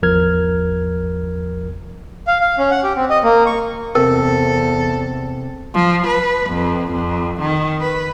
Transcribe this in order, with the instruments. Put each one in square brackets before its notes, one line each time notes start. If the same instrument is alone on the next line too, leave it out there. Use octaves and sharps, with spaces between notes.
[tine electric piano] G#1 E2 F3 A#4 F6 G#6
[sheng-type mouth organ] F5
F5
C#4
F#5
G4
C4
D#5
A#3
C#6
[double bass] E2 [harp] C3 [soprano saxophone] A4 [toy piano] A#4
[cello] F3
B4
F2
F2
D#3
B4